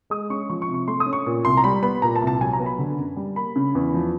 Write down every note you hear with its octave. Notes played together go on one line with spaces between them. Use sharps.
G#3 D#6
C#4 C#6
F3 C#6
C#6
C3
C#6
A3 C6
D#6
C#4
C#6
A#2
C2 C6
A#5
G3 B5
B3 B5
A#2 A#5
A5
C2
A5
F#3 G#5
A#5
B3
B5
D3
F#2
G3
A#3 B5
C#3
E2
F3